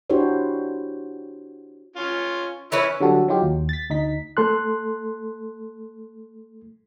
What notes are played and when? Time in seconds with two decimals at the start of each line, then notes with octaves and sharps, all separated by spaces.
0.10 D4 E4 F#4 G4 C5 C#5
1.96 C#4 F4
2.72 E3 C#4 E4 B4 E5
3.00 D3 F#3 G3 F#4 A4
3.28 F#3 D#4 F4 G4
3.43 D#2
3.69 A6 B6
3.90 D2 D#4 B6
4.37 A3 A4 C6 F#6